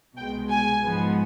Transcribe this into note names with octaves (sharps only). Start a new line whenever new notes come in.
C2 B2 G#3 G5
G#5
G#2 F3 B3